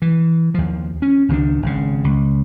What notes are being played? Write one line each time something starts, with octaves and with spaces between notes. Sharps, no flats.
E3
D#2 F3
C#4
C#2 D#3 E3 D4
G#1 C#3
C#2